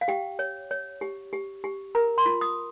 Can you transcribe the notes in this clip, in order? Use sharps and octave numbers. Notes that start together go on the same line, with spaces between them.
F5
G4 G5
C#5
C#5
G4
G4
G4
A#4 A#5
C6
F4
D#6